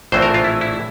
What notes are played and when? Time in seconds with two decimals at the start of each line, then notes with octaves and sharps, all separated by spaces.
0.12 A#1 A2 E3 A3 C4 C5
0.22 A#4
0.34 F4
0.44 E4
0.61 E4